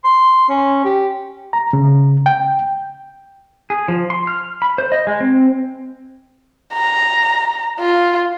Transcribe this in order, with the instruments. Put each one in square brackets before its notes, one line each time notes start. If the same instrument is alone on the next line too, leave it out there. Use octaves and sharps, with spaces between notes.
[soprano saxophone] C6
C#4
G4
[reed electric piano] A#5
C#3
G5
[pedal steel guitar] G#4
F3
C6
F6
B5
C5
D#5
G#3
C4
[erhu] A#5
F4